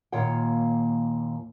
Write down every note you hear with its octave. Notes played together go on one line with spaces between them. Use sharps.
D#2 A#2 F4 C#5 F#5 G5